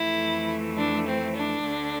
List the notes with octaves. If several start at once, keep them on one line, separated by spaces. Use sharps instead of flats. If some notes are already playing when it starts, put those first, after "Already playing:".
Already playing: F2 E3 A3 E4
D4
C4
D4
D2 D3 A3